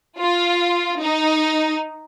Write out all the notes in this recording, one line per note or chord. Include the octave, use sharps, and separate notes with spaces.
F4
D#4